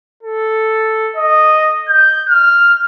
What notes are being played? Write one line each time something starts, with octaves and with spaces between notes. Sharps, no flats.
A4
D#5
G6
F6